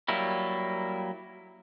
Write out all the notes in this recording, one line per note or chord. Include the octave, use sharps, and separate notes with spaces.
F#3 G3 A#3 E4